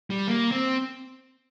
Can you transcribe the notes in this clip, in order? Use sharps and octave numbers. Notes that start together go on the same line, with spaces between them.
G3
A#3
C4